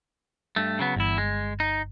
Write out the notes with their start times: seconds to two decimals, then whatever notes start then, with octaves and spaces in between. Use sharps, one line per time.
0.56 G2 A3
0.79 C#3 F#3 B3
0.96 G1 E2 E4
1.18 G#3
1.60 D#4